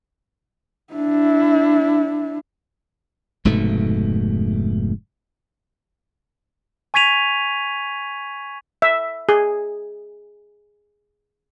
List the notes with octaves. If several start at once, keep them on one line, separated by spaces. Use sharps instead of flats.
D4 E4
F1 G#2 B2 A3
G#5 C#6 G#6 B6 D#7 F7
E5
G#4